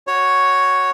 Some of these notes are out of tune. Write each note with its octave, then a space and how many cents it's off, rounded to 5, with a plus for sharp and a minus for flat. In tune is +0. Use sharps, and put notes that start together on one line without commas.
F#4 +0 C#5 +0